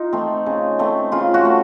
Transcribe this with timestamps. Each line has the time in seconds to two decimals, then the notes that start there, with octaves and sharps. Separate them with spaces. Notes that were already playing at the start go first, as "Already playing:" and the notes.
Already playing: D#4 F4
0.13 A3 C4
0.46 C#3
0.79 A3 C4
1.12 C#3 F4
1.34 F#4
1.45 A3 C4